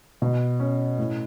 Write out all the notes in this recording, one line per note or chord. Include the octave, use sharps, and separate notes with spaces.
B2
C#4
A2